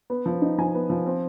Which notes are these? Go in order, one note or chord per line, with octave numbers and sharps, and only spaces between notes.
B3
F3
D#4
F3 G#5
B3
F3
C4